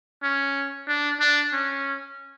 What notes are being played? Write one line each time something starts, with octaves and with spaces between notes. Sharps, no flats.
C#4
D4
D4
C#4